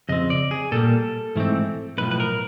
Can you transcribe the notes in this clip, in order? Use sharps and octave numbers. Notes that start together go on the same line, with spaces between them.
F2 C#3 C4 D#5
D5
G#4
A#2 G3 A#3 A4
G#2 E3 A3 C4
B1 A2 F3 B4
B4
A#4